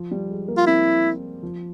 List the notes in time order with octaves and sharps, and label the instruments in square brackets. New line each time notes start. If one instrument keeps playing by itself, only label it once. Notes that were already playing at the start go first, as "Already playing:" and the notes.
Already playing: [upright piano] F3
G3
G#3
A#3
[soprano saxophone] F4
[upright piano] C4 [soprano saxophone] E4
[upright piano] F3